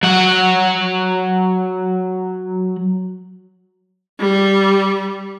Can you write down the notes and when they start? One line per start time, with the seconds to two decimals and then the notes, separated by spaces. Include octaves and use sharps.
0.03 F#3 F#5
4.20 G3